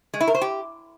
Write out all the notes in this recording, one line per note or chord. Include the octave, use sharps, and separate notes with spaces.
G#3
E4
A#4
C5
G4